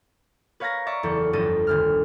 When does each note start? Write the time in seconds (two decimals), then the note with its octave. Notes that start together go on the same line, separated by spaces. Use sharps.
0.60 B4 C#5 F5 A#5 G#6 A#6
0.86 D5 E5 A#5 C#6
1.03 F#1 E2 A4 C#5 C#7
1.33 G1 F2 A4 A#6 D#7
1.67 D#1 D2 F6